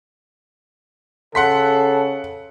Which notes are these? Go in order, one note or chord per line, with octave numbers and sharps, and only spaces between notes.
C#3 A4 F#5 C6 B6